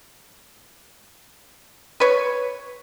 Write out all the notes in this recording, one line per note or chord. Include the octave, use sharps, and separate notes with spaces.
B4 C#5